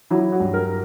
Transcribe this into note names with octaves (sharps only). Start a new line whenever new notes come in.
F#3 E4
F#4
G2
A#4